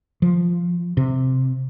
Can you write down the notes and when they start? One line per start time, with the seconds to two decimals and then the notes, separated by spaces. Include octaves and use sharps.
0.22 F3
0.97 C3